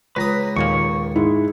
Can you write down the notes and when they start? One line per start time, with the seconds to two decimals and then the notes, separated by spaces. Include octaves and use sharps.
0.16 C#2 B4 A#5 D#6
0.56 D#2 A#2 A#3 C#6
1.16 G#2 G#3 E4